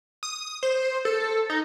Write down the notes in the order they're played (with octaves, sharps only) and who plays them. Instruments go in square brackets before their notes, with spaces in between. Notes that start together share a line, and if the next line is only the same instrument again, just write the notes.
[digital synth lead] D#6
C5
A4
D#4